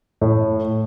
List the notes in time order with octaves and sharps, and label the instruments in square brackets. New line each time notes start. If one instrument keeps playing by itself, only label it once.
[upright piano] A2